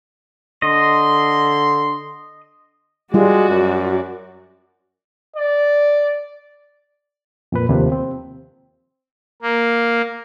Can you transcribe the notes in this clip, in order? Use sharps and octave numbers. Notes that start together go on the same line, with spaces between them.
D3 D#5 C6
G3 G#3 F4 F#4 D5
F#2
D5
F2 A#2 B4
D#2 C3 D#3 F3
C4
A#3